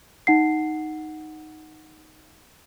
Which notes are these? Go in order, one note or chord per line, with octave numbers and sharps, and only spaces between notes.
D#4 F#5 C7